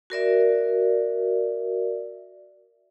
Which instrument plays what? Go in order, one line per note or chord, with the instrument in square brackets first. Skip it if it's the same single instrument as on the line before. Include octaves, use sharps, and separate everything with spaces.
[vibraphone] F#4 A#4 D5 E5